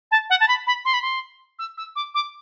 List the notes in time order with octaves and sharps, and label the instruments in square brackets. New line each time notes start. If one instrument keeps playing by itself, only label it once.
[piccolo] A5
F#5
A5
B5
B5
C6
B5
C6
E6
E6
D6
D6